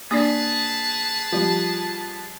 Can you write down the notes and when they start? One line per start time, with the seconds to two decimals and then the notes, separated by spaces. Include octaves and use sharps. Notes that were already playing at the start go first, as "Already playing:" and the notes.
0.11 A#3 D4 G#4 B4 D5 A5 D#6
1.32 F3 G3